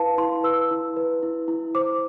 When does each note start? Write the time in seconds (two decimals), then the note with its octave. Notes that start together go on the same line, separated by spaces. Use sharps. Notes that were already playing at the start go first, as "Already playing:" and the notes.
Already playing: E4 B4 F5 A5
0.18 E4 C6
0.44 B4 E6
0.71 E4
0.96 B4
1.23 E4
1.48 E4
1.75 C5 D6